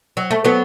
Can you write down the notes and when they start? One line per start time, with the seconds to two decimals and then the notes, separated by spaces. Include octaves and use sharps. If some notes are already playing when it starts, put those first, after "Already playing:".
0.17 F#3
0.31 A3
0.44 F#3 B3